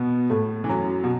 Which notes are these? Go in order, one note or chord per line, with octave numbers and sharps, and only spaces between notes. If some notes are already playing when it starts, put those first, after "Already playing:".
Already playing: B2 B3
A2 A3
E3
F#2 F#3
B2